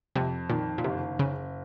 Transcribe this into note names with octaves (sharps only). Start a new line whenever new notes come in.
F2 C3
A#2 D#3
A#2
F#1 C3
F#1 C#3